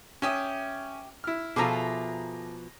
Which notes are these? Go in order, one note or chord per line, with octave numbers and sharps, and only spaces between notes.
C#4 G4 E5 D#6
E4 F6
B2 F3 F4 G#4 A4 E5 A#5 D6